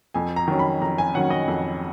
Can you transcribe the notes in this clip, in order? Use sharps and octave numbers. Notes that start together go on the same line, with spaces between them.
F2 G#5
A#5
D#3 F#3 C#4
B5
F2 A#5
G#5
D#3 F#3 C#4 F#5
D#5
F2